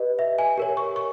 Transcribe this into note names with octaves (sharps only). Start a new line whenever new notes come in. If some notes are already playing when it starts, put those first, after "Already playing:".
Already playing: G4 B4 D#5
E5
G#5
G4 A#4 C#5
C#6
C#6